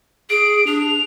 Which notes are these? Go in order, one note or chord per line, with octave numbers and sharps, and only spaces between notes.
G#4 D7
D4 F7